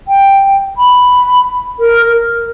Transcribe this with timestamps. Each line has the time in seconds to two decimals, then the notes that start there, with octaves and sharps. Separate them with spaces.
0.08 G5
0.77 B5
1.79 A#4
2.09 A#4